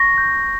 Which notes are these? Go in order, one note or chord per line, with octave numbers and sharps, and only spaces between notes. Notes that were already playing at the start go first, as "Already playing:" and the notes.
Already playing: C#6 A#6
G6